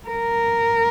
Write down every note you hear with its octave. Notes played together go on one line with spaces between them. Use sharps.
A#4